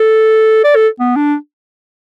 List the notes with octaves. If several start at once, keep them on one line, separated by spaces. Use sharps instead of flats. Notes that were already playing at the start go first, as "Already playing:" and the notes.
Already playing: A4
D5
A4
B3
D4